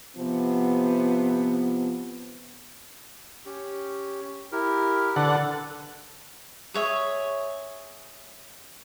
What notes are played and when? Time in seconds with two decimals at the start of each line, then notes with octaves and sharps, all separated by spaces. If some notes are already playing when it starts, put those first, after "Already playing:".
0.16 C3 F3 B3
3.46 C#4 G4
4.52 E4 G4 A#4
5.16 D3 A4 B4 F#5
6.74 G#4 C#5 E5